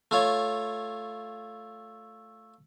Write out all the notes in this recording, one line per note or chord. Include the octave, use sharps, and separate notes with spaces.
A3 F4 C#5